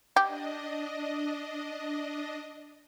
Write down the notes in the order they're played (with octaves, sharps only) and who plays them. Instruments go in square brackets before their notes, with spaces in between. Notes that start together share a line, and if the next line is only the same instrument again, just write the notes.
[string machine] D4 D#5 [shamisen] G4